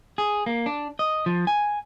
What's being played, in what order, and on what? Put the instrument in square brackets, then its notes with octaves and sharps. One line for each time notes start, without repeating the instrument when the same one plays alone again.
[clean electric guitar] G#4
A#3
D4
D#5
F3
G#5